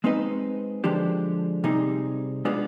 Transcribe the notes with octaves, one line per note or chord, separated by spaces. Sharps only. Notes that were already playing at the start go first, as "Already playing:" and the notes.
G#3 C4 D#4 B4 D#5
D3 F3 G#3 D4 G4
C3 G3 C4 D#4 G#4
G#3 B3 D4 F4 G#4